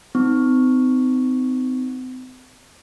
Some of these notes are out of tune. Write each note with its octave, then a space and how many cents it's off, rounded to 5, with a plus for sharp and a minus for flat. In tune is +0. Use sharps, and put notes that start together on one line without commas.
C4 -35 D#4 +0 C#6 +0